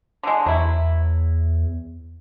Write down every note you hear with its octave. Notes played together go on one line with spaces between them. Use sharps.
D3 G#3
E2 F#3 E4